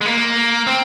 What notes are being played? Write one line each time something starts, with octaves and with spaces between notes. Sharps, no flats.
G#3
A#3
C4